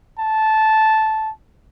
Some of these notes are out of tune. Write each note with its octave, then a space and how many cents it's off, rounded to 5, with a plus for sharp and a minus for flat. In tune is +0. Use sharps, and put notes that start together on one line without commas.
A5 -10